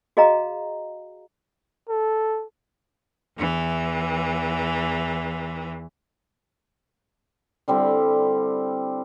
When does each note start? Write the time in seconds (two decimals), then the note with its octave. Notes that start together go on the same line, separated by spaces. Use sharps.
0.17 F#4 G#4 D#5 F5 A#5
1.89 A4
3.38 E2 E3
7.68 D3 G3 C4 E4